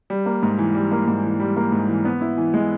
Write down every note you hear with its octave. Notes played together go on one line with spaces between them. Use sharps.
G3
A#3
G#2
E3
G3
A#3
G#2
E3
G3
A#3
G#2
E3
B3
E4
E3
G#3